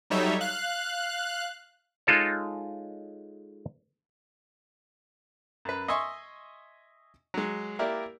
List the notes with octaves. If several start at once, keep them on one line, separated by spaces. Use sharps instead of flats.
F#3 G3 D#4 A4 C#5 E5
F5 F#6
G#3 D#4 F4 A4 C#5
F#2 B4
D#5 E5 G#5 C6 C#6
F#3 G#3
A#3 E4 G4 A#4 D5